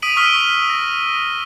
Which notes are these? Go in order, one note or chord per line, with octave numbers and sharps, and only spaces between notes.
D#6 B6 D7 D#7 F#7
C#6 E6 F6 B6 D#7 G7
A#6